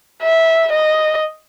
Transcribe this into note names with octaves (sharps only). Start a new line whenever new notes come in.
E5
D#5